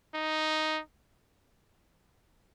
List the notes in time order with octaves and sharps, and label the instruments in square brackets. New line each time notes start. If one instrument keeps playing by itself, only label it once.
[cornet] D#4